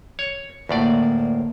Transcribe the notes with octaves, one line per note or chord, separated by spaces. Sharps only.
C#5
D2 A2 A#3 D5